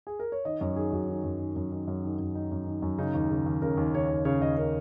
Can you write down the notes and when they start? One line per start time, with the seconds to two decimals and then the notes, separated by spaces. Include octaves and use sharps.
0.07 G#4
0.19 A#4
0.32 C#5
0.45 D#3 D#5
0.61 F#2 C#5
0.76 D#3 G#4
0.92 F#2 F#4
1.09 D#3
1.24 F#2
1.40 D#3
1.56 F#2
1.72 D#3
1.88 F#2
2.04 D#3
2.19 F#2
2.35 D#3 D#4
2.52 F#2
2.67 D#3
2.82 F#2
2.98 C#3 D#4
3.14 D#2
3.31 C#3
3.46 D#2
3.62 C#3 A#4
3.77 D#2
3.94 C#3 C#5
4.10 D#2
4.25 C#3 C#5
4.42 D#2 D#5
4.57 C#3 A#4